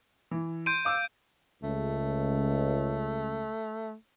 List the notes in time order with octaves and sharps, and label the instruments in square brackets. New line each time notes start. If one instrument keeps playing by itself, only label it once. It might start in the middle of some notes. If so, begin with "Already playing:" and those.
[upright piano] E3
[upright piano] C6 [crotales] G6 D7 D#7
[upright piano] F5 D6 E6
[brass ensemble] C#2 [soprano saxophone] A3